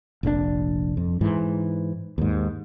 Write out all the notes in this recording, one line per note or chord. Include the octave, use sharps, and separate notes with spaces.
F1 A#1 C3 D4
F2
G#2 E3
D#2 G#2